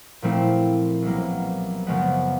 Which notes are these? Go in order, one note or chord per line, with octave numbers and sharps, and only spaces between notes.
A#2 F3 A3 C4 E4
C2 B2 F#3 A#3
F#2 C#3 F3 G#3 B3